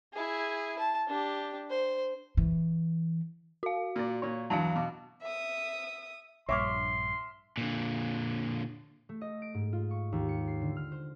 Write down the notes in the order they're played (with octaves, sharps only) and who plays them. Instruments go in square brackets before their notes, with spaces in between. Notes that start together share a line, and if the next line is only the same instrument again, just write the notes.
[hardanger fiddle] E4 G#4
A5
D4 G4
C5
[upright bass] E3
[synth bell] F#4 F5
[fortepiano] A#2 D5
A#2 C#5
[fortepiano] E2 G2 F#3 [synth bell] F5 A5
[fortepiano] B2 D6
[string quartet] E5 D#6
[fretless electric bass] A#1 G2 [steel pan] C#5 [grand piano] E5 D6 F6 [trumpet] C6
[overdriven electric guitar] A#2 D3
[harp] A3
D#5
D7
G#2
F4
C#6
D#2
C#7
C7
D3
F6
C5